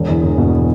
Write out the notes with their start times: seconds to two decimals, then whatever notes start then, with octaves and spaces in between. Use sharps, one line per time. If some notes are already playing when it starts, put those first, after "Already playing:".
Already playing: E1
0.09 E2
0.23 E1
0.38 B2